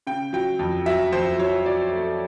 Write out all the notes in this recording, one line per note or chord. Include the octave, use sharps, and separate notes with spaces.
C#3 G5
F#3 G5
F2
F#3 E5
F2 C5
F#3 C#5
F#3 D5
A3